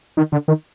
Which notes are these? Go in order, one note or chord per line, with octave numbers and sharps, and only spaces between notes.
D#3
D3
D#3